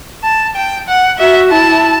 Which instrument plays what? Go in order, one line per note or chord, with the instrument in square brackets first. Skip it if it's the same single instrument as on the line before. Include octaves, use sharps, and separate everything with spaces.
[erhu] A5
G5
F#5
[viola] F#4 [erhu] E5
[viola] E4 [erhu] A5